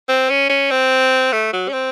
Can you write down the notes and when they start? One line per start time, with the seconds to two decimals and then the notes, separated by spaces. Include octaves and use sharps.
0.09 C4
0.30 C#4
0.49 C#4
0.71 C4
1.32 A3
1.53 F#3
1.68 C#4
1.73 C4